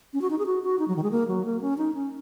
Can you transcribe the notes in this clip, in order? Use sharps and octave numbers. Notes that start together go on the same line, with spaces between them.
C#4
F#4
D#4
G#4
F#4
F#4
D#4
F#3
D#3
G#3
A#3
F#3
A#3
C#4
D#4
C#4